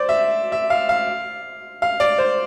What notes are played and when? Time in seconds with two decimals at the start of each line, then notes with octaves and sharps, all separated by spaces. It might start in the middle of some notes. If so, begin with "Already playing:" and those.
Already playing: C5 D5
0.09 E5
0.52 E5
0.70 F5
0.89 F5
1.82 F5
2.00 D5
2.18 C5